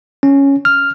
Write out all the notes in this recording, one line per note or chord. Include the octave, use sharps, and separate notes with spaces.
C#4
F6